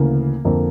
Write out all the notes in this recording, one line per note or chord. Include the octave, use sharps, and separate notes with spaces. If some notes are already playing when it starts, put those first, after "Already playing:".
Already playing: D2 C#3 E3 A#3
F2 D3 A#3